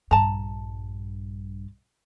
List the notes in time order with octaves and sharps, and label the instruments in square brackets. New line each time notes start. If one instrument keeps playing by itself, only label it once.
[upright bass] A#1 G2 [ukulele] A5 A#5